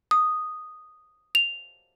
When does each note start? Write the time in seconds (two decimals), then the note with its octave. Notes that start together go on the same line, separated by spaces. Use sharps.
0.11 D#6
1.35 F7